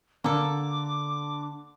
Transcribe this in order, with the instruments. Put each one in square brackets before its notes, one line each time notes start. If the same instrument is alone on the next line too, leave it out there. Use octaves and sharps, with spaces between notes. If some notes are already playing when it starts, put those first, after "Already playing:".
[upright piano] D3 D4 [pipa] A#3 A4 [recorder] D6